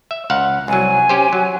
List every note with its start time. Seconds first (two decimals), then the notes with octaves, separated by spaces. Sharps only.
0.11 E5
0.30 C#2 F5 F#5
0.68 C2 F#3 G#5
1.09 C#4 G4 C5
1.33 F#3